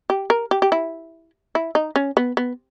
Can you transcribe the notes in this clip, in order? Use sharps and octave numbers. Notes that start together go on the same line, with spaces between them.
G4
A#4
G4
G4
E4
E4
D#4
C#4
B3
B3